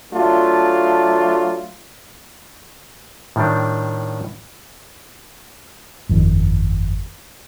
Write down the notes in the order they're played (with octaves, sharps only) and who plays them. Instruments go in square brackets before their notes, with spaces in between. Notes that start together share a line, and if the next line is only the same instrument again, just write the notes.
[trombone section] F#3 A3 D4 F4
[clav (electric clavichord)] A2 D#3 G3 D4
[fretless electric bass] G1 F2 D#3